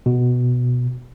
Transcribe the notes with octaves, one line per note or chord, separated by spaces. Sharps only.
B2